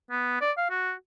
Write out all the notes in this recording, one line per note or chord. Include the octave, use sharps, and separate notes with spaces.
B3
D5
F5
F#4